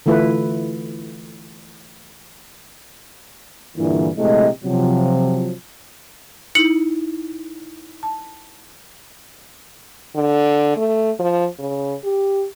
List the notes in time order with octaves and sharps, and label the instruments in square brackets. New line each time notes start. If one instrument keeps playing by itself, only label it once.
[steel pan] D3 E3 A3 E4 F4 B4
[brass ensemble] G2 A#2 D3 E3
A#1 C3 G#3 A3 E4 D#5
C3 F3 F#3
[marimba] D#4 E4 [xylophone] C#7 F#7
[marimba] A5
[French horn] D3
A3
F3
C#3
G4